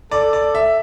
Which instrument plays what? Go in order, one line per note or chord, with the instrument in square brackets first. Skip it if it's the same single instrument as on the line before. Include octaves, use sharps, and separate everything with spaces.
[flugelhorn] A4 [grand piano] D5
[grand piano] D5
E5